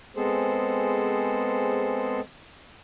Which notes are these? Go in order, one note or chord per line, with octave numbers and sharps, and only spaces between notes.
G#3 B3 C4 G#4 A4 C5